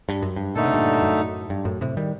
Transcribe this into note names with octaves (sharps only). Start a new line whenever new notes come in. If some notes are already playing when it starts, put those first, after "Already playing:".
G2
F#2
G2
A#2 D3 A3 D#4 A4
C3
G2 A#2
F#2 A2
G2
F#2 A2
A2 C3
D#3 G3